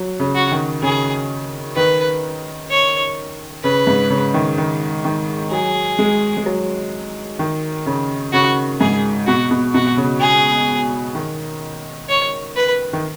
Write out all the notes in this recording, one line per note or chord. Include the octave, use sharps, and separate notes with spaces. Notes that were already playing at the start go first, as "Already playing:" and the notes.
Already playing: F#3
C#3
F#4
D#3
C#3 G#4
D#3 B4
C#5
C#3 B4
G#2
C#3
D#3
D#3
D#3
F#3 G#4
G#3
G#3
F#3
D#3
C#3
C#3 F#4
G#2 G#4
B2 F#4
B2
B2 F#4
C#3
G#4
D#3
C#5
B4
D#3